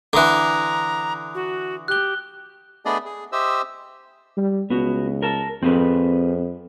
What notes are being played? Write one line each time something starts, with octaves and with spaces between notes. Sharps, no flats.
D3 E3 A#5 D6 D#6 F#6
F#4
G4 F#6 G7
A3 B3 D4 G#4 D5 D#5
G#4
G4 C5 D#5 E5 E6
G3
C#2 B3 F#4
A#4 A5
F2 C4 G#4 B4